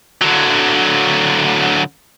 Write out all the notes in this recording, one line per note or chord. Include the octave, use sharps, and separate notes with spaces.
D3 F#3